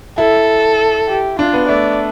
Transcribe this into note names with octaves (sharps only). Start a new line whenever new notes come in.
E4 A4
G4
D4 F4
B3
A3 D5